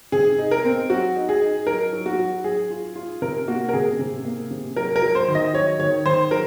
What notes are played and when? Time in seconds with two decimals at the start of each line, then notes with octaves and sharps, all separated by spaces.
0.12 C3 G#4
0.38 D#4
0.51 A#4
0.65 C4
0.90 F#3 F#4
1.16 D#4
1.29 G#4
1.41 D#4
1.67 F#3 A#4
1.93 F#3
2.06 F#4
2.19 F#3
2.44 F#3 G#4
2.70 F4
2.96 F4
3.22 C3 A#4
3.48 A#3 F#4
3.69 A#4
3.73 C3 G#4
3.99 C3
4.25 A#3
4.51 C3
4.76 F#3 A#4
4.96 A#4
5.02 F#3
5.15 C5
5.28 D#3
5.35 D#5
5.53 F#3 C#5
5.79 D#3 C#5
6.05 D#3 C5
6.31 F#3 A#4